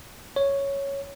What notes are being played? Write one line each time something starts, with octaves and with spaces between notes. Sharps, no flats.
C#5